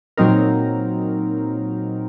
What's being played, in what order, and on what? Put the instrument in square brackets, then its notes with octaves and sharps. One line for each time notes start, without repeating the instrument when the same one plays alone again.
[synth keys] A#2 F#3 C4 D#4 A#4